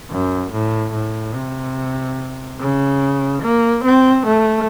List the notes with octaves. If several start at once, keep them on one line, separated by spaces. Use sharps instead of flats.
F#2
A2
A2
C3
C#3
A#3
C4
A3